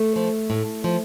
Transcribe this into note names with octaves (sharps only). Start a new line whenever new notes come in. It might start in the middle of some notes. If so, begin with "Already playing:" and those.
Already playing: A3
F3
A2
F3